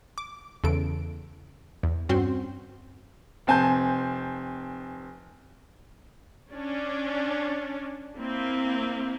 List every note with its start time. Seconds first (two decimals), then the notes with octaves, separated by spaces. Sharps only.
0.18 D6
0.64 E2 C#3 A4 D7
1.83 E2
2.09 G2 C4 C#4 F#4 C6
3.47 F1 C4 G#5 A5 G6
6.52 C#4 D4
8.18 A#3 C4 E4